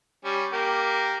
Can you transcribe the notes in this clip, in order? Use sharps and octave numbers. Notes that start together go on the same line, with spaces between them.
G3 C#4
A#3 G4 A#4